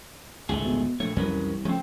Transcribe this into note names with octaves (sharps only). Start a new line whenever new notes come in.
G#1 C#2 D3 A3 G#4
B2
A#1 A#2 C#3 A3 C#5
C2 F2 E3 F#3 C#4 A#4 B4
C#3 F3 A3 C4 C#4